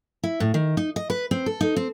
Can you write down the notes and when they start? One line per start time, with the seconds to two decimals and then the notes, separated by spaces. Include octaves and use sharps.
0.23 E4
0.40 A2
0.54 D#3
0.77 D#4
0.96 D#5
1.10 B4
1.31 C4
1.46 A4
1.61 D#4
1.76 C4